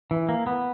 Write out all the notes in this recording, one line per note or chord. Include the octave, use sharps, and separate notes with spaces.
E3
A#3
B3